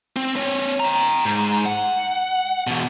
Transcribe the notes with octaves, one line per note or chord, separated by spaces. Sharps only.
C4
C4 C#5
G5 A#5
G#2
F#5
E2 B2